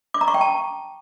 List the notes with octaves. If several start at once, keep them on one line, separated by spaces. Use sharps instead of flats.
D6
A#5
C#6
G5
A5